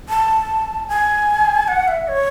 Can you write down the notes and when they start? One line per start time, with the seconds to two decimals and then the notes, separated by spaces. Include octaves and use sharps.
0.09 A5
0.88 G#5
1.68 F#5
1.88 E5
2.08 C#5